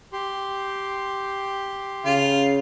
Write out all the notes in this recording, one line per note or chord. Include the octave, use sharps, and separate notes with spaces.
G4 C6
C#3 F4